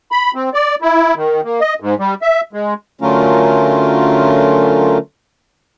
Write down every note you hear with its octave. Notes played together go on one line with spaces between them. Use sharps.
B5
C4
D5
E4
D#3
A#3
D#5
G#2
G3
E5
G#3
D3 F#3 A3 C#4 F4 A#4